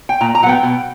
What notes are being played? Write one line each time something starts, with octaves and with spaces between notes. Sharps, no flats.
G5
A#2 A#5
A#5
F#3 B3 F#5 G5
B2